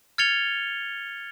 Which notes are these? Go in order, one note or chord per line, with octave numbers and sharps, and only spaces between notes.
F6 G#6 A6 C#7 F7 G7